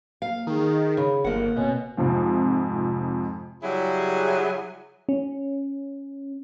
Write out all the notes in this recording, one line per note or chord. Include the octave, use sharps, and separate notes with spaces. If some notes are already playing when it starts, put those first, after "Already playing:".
A#3 F5
D#3 D#4 G#4
C#3 G#4 C#5 B5
G1 A#3 A#4 F#5
B2 C4 C#5 G#5
F2 G#2 C3 F3
C#3 F#3 G3 E4 G#4
C#4